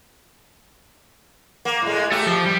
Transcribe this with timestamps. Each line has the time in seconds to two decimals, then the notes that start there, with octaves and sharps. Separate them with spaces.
1.65 A#3
1.82 A2 G#3
2.12 A3 G4
2.27 F3
2.46 G3